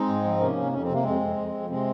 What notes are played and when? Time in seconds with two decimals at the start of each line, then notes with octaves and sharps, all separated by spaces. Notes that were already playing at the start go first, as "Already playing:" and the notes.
Already playing: G#3 C4 D#4
0.09 G#2
0.24 F3
0.40 C3 A#3 C#4
0.56 C3
0.72 F2 C#4
0.83 C4
0.88 C3
0.94 A#3
1.03 F2 G#3 C4
1.21 F2
1.37 F2
1.54 F2
1.70 C3 G#3 C4